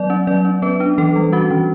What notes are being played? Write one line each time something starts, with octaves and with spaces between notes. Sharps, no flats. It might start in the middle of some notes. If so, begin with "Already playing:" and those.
Already playing: F#3 B3 D5
C#4
F#3 D5
C#4
B3 B4
D4
E3 A4
G3
C#4 F#4
E3